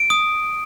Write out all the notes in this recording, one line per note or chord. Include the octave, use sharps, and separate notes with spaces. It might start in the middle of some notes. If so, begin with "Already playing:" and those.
Already playing: D7
D#6